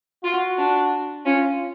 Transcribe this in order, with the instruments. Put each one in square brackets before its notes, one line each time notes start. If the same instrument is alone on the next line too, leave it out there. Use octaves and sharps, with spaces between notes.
[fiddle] F4 [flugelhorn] F#4
[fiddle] D4
[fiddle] C#4 [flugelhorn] F4